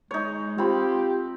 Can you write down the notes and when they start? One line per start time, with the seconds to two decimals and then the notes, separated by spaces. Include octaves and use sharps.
0.11 G#3 D#4 C#5
0.58 C4 F4 G4 B5